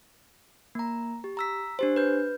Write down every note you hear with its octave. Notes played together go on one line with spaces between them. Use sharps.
A#3 A#5
G4
A#5 E6 B6
D4 G4 C5
B4 G6